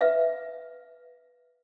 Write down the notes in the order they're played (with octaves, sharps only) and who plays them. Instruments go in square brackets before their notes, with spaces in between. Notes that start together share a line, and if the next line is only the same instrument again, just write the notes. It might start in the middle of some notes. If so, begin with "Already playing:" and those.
[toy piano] B4 E5 F5